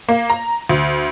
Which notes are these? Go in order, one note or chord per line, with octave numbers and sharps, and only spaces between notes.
A#3
A#5
D2